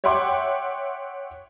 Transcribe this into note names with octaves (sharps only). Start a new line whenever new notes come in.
C#5 E5 F#5 G5 C6 D6